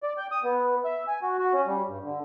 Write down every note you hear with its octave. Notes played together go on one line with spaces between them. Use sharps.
D5
G5
D#6
B3
E5
G#5
F#4
F#4
C#4
G3
G2
D3